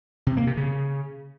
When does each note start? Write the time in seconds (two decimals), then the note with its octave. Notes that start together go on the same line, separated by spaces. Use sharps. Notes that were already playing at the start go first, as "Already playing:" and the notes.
0.27 C3
0.37 A#3
0.47 C3
0.57 C#3